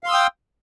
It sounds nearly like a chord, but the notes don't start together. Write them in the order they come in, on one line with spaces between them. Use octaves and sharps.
F5 C6 E6 D#6 G5